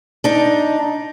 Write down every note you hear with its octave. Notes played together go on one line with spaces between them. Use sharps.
D4 D#4